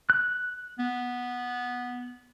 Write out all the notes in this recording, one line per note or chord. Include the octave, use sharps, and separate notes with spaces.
F#6
B3